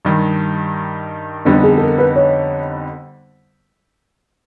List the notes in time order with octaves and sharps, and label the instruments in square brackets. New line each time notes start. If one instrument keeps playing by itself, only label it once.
[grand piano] G2 D#3 G3
[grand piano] F2 D3 G3 B3 D#4 [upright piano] D4
[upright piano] G#4
A4
A#4
B4
C#5